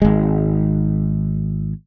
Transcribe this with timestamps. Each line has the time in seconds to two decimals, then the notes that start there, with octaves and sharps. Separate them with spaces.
0.02 G#1 G#3